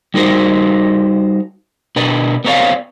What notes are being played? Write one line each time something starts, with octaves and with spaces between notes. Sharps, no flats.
G3 D#4 F#4 A#4 C5
B2 D4 A#4 B4
B3 C4 A#4 C#5 D5 F5